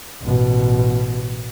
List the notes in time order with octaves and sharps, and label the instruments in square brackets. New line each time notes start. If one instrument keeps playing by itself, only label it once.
[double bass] A1 B2